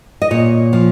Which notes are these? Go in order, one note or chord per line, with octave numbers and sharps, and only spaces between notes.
D#5
A#2 C#5
F3